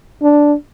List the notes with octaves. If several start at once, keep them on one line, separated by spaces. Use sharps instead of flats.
D4